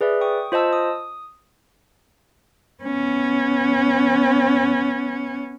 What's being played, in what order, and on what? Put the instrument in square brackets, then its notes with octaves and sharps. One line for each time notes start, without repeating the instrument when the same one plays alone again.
[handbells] G#4 B4 D5 E5
G5 C#6 D#6
F4 C5 D#5 A5 E6
D#6
[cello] B3 C#4